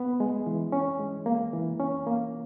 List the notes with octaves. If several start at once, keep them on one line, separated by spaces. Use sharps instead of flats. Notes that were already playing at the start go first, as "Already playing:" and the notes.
Already playing: B3
G#3
E3
C#4
G#3
A#3
E3
C#4
A#3